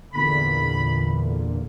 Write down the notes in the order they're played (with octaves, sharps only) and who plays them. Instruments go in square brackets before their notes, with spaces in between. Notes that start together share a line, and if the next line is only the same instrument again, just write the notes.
[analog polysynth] E2 A#2 D3 [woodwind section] B5